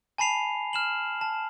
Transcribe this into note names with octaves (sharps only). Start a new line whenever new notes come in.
G#5 A5 B5 C7 F7
F6 E7 F#7
A5